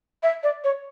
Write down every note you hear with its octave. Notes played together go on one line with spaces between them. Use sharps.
E5
D5
C#5